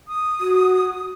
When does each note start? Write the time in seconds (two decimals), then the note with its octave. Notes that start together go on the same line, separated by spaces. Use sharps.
0.08 D#6
0.40 F#4